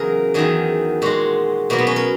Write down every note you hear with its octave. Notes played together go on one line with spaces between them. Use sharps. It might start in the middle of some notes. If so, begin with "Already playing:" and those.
Already playing: E2 C#3 F#3 G#4 A#4
E2 D#3 F#3 G#4
A#2 G#3 F#4
B2 F#3 A#3
B3
C#4
A#4